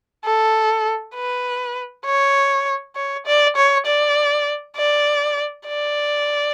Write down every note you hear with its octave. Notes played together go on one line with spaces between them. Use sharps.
A4
B4
C#5
C#5
D5
C#5
D5
D5
D5